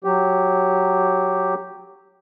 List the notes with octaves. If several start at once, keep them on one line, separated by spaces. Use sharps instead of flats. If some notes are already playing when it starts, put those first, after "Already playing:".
F#3 G4